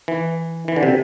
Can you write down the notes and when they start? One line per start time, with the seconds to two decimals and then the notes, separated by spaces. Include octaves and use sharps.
0.08 E3
0.68 E3
0.76 D3
0.83 C3